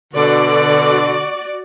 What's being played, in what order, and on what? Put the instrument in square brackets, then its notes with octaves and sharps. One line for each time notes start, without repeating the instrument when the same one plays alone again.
[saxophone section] B2 D3 [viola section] F#4 D5